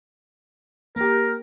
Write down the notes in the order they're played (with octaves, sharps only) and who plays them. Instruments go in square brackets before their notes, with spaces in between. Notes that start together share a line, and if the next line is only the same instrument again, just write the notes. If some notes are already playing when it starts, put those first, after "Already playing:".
[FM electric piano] A#3 G4 [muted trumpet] A#4